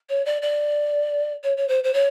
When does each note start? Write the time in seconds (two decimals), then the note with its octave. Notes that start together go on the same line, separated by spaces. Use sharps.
0.09 C#5
0.26 D5
0.42 D5
1.44 C#5
1.57 C#5
1.68 C5
1.84 C5
1.94 C#5